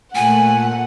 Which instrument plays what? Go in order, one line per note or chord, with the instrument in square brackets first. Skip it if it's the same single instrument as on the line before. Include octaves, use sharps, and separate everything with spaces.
[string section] A#2 A3 F#5 [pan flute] G#5